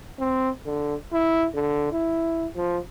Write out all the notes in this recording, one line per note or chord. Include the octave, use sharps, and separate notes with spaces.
C4
D3
E4
D3
E4
F3